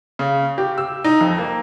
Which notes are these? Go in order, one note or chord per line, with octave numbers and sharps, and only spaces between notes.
C#3
G4
E6
D#4
F2
A#3